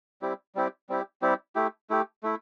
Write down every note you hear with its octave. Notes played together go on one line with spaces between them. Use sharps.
G3 C4 E4 G4
G3 C4 E4 G4
G3 C4 E4 G4
G3 C4 E4 G4
A3 E4 G4
A3 E4 G4
A3 E4